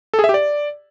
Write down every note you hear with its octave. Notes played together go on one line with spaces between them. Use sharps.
A4
G#4
E5
G4
D5